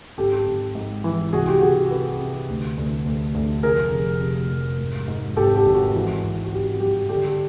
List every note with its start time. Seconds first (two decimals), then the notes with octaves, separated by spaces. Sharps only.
0.18 G#1 G4 A4
0.47 G#1
0.75 G#2
1.04 E3
1.33 C2 F#4 G#4
1.48 G4
1.62 C2 F#4 G#4
1.91 C3 A4 B4
2.20 C3
2.49 D2
2.77 D2
3.05 D2
3.35 D2
3.63 F1 G#4 A#4
3.92 F1
4.21 C3
4.51 F1
4.79 G#2
5.08 G#2
5.36 G#1 G4 A4
5.56 G4
5.65 G#1
5.74 F#4
5.95 E3
6.23 G#1
6.45 F#4
6.51 G#1 G4
6.80 G2 G4
7.09 D3 G4 A4